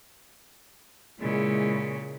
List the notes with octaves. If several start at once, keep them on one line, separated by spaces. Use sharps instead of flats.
A#2 C#3 G#3 E4